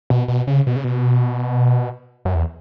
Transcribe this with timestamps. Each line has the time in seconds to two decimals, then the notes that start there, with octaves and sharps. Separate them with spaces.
0.10 B2
0.28 B2
0.47 C#3
0.67 B2
0.76 C#3
0.84 B2
2.25 F#2
2.35 E2